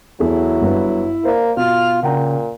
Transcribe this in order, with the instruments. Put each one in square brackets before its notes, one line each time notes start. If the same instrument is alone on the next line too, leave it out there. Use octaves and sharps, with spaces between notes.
[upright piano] E2 G#4 A4 [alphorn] F#3 [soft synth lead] E4
[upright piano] G1 G2 B4
[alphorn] A#3 [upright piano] C5 D5
[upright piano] B2 [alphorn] F4 [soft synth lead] F6
[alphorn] A#2 [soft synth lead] C#3 [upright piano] F#5 G5 A#5